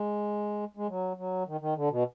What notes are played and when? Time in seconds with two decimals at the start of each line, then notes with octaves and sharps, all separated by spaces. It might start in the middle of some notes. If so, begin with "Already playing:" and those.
Already playing: G#3
0.77 G#3
0.88 F#3
1.17 F#3
1.47 D#3
1.61 D#3
1.76 D3
1.90 B2